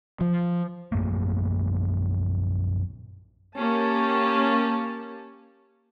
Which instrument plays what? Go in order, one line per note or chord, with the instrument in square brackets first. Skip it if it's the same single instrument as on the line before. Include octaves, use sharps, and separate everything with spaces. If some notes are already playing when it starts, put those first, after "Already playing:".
[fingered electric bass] F3
[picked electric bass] A#1 F#2 A3 A#3
[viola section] A#3 C#4 G4 A5